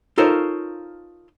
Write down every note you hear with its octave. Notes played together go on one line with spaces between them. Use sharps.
D#4 F4 A4 A#4 C5 C#5